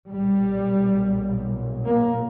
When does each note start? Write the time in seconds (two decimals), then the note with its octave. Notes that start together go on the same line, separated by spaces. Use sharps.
0.11 B1 A#2 G3
1.85 A#3